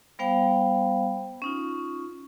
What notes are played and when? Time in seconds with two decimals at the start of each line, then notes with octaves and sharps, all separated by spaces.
0.19 G3 B3 C5 F5 G5 B5
1.42 C#4 D#4 F4